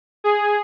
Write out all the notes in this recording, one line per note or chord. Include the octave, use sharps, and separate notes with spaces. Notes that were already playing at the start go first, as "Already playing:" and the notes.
G#4